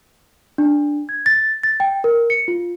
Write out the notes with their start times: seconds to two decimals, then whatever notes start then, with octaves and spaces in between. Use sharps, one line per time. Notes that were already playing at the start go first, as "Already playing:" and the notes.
0.58 D4
1.09 G#6
1.26 A6
1.63 A6
1.80 G5
2.04 A#4
2.30 C#7
2.48 F4